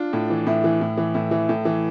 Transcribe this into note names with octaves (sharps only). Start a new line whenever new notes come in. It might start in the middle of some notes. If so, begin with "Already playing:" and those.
Already playing: D4 F4
A2
E3
A2 E4
E3
A2
E3
A2 E4
E3
A2
E3